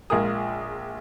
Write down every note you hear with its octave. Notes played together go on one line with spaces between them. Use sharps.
A#1 G#3 F4 G#4 A#4 D#6